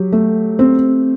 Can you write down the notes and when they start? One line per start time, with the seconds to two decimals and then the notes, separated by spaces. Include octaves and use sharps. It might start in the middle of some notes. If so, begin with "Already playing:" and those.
Already playing: F#3 G4
0.12 A3
0.59 C4